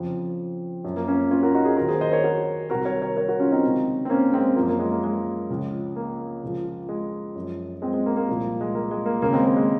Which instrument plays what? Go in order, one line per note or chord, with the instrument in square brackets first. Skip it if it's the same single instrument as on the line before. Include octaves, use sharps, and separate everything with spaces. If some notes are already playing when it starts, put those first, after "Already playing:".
Already playing: [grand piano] F2 C#3 F3
F#2 F3
A#3
A#3 C#4
C#4 F4
F#4 A#4
D#4 F#4
F4 G#4
D#2 D#3 F#3 F#4 A#4
G#4 C5
C5 D#5
A#4 C#5
F#4 A#4
C2 C3 D#3 F#3 F#4 A#4
A#4 C#5
A#4 C#5
A#4 C#5
F#4 A#4
C#4 F4
C4 D#4
C#2 C3 D#3 F#3
C4
A#3 C#4
G#3 C4
F#2 F3 A#3
A#3
G#3
A#3
G#3
C#2 C#3 F3
A#3
C#2 C#3 F3
G#3
F#2 F3
G#3 C4
G#3
A#3
A#3
C2 A#2 F3
G#3
A#3
G#3
A#3
D#2 C#3 F#3 A#3
G#3 C4
A#3
G#3